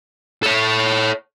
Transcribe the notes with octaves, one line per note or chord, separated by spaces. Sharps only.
A4 C#5